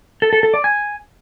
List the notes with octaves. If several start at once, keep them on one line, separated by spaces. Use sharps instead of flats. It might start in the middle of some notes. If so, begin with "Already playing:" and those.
A4
A4
A4
D5
G#5